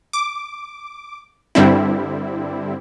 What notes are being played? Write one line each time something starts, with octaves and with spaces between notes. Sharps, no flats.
D6
G2 D3 G3 C4 E4